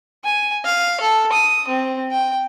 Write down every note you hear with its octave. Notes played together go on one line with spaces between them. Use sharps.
G#5
F5
A4
D#6
C4
G5